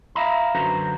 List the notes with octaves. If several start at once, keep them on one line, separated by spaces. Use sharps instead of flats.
E5 F5 A#5 B5
F#2 D3 F#4 B4 C5 A#5